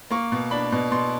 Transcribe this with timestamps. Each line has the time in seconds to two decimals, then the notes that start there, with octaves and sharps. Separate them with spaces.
0.10 A#3 C#6
0.32 B2
0.51 D4 B5
0.72 B2
0.92 B2 C6